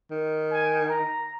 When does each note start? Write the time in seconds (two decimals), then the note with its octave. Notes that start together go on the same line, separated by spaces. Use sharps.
0.11 D#3
0.52 G#5
0.90 A#5